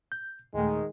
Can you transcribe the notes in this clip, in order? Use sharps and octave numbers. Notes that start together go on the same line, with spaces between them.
G6
D#2 A#2 D#3 G#3 A3